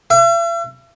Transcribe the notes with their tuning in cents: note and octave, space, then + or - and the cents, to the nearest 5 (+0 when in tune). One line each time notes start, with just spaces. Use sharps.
E5 +45